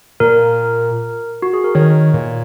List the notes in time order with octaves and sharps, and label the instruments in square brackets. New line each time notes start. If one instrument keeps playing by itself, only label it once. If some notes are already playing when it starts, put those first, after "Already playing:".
[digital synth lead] A#2 [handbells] A#4
[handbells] F#4
G#4
A#4
[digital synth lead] D#3 [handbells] C#5
[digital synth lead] A#2